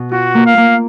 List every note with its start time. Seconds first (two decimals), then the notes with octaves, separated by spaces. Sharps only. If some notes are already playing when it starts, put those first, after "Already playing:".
Already playing: B2
0.11 F4 F#4
0.34 A#3
0.46 F5
0.57 A#3